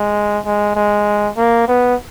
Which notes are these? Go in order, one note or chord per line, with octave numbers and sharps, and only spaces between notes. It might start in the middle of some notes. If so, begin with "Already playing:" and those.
Already playing: G#3
G#3
G#3
A#3
B3